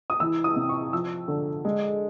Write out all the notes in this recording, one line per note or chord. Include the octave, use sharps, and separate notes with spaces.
D#6
E3 E6
D#6
C3
C#6
F3 E6
D3
G#3